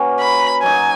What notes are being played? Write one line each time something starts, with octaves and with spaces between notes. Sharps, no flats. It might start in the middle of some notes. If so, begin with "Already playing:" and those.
Already playing: A#3 C#4 F#4 B4
B5
F#3 A#3 D#4 G#5